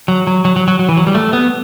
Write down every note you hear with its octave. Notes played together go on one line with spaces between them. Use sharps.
F#3
F#3
F#3
F#3
F#3
F#3
E3
F#3
G3
A3
B3